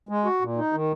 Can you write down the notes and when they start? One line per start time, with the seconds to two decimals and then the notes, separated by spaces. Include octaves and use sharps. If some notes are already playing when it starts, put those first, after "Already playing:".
0.09 G#3
0.25 F#4
0.41 A#2
0.57 D#4
0.73 D#3